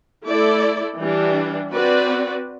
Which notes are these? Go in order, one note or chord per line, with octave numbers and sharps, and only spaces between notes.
A3 E4 A4 D5
E3 G3 D4
C4 F#4 B4 D5